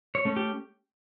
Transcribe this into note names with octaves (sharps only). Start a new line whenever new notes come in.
C#5
A3 C#4
G4